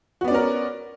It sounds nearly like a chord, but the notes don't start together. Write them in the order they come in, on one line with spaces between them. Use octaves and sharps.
F#4 B3 D5 C#4 A#4